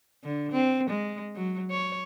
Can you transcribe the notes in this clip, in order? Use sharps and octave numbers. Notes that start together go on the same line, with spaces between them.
D3
C4
G#3
F#3
C#5